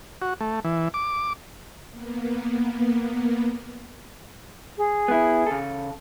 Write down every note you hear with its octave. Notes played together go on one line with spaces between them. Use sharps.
F#4
A3
E3
D6
A#3 B3
G#4
B3 E4
C#3 A4